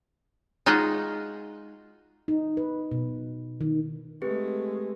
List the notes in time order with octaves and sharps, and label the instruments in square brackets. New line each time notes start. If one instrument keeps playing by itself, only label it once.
[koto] G#3 D#4 F4 F#4 G#4 D#5
[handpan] D#4
B4
B2
D#3
[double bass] G#3 A3 [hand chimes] C4 G4 B4